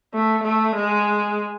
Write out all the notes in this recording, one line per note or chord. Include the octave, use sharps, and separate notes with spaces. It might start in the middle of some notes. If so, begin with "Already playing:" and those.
A3
A3
G#3